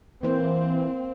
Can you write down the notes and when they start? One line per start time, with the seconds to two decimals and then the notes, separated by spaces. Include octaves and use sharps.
0.23 E3 A#3 C4 C5